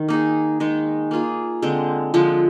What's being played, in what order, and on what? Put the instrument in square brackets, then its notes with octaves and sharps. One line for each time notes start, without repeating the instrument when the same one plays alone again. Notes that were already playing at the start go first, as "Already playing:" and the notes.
Already playing: [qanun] D#3
A#3 D#4 G#4
D#3 G#3 D#4
A#3 F4 G#4
D3 G#3 C4
D3 F3 G#3